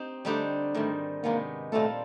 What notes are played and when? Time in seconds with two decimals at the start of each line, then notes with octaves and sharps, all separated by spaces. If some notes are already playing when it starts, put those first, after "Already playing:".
Already playing: C4 D#4 G4
0.25 D3 G3 A3 C4 D#4 G4
0.74 G#2 D#3 G3 A3
1.23 C3 D#3 G#3 A#3 B3
1.72 A#2 G3 A3 C4 F4 A4